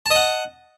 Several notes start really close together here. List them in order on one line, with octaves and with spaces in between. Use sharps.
A5 D#5 F#5